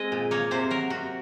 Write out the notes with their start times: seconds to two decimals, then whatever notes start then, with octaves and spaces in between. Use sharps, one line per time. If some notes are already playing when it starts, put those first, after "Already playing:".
Already playing: G#3 C4 D#5
0.12 A#2
0.31 A#3 C#5
0.51 C3 C5
0.71 F#3 A#4
0.90 C3 F#4